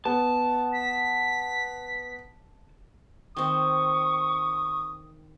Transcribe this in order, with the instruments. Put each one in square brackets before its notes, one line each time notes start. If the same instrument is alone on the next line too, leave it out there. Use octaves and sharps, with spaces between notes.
[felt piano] B3 [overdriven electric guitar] A5
[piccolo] B6
[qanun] D#3 C4 [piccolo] C#6 [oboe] D#6